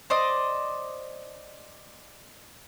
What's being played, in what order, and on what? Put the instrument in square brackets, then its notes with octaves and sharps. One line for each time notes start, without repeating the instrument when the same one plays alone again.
[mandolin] C5 D5 D#5